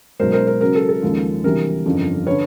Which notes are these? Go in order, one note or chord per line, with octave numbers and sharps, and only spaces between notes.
B1 B2 G#3 A#4 C5
A#4 C5
A#4 C5
C#2 C#3 F#3 A#4
A4
A4
D#2 C#3 F3 G#3
D2 C3 E3 G3 A#4
G1 F2 C#3 F3
D3 B4 C#5